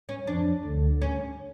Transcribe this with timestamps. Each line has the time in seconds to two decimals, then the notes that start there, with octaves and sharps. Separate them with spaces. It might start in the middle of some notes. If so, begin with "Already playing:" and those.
0.09 C#4
0.27 F2 F3 D4
0.64 D2 D3
1.02 C#4